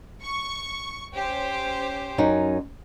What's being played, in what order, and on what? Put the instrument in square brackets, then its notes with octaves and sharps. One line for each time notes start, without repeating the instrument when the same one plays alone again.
[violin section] C#6
C#4 G4 C5
[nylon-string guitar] F#2 C#4 D#4